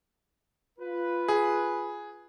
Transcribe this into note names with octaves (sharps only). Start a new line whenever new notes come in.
F4 B4
G#4